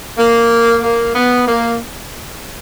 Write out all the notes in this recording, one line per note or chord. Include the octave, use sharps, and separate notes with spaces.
A#3
A#3
B3
A#3